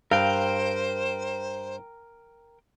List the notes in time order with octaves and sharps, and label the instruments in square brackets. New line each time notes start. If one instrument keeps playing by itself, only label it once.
[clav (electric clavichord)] G2 [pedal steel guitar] A#4 G5 [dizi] C5 [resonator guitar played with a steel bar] F5